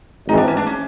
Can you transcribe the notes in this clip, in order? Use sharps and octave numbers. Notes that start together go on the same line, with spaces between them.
G#1 G#2 E3 G#3 C4 D#4
D4
C#4
D4
C#4